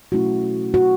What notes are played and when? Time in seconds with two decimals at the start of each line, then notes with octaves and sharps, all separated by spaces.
0.12 B2 F#3 A3 C#4 E4 F#4
0.74 F#4